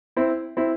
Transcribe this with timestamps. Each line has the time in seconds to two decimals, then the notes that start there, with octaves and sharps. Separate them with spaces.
0.16 C4 E4
0.57 C4 E4